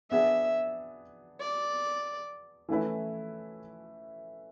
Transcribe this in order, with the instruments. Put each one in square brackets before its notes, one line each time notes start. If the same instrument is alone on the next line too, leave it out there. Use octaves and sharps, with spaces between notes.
[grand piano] B3 D4 G#4 [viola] E5
[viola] D5
[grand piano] E3 A3 C#4 E4 B4